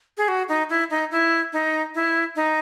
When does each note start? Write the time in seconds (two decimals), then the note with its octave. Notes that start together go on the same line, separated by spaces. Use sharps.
0.17 G#4
0.28 F#4
0.49 D#4
0.70 E4
0.90 D#4
1.11 E4
1.53 D#4
1.95 E4
2.36 D#4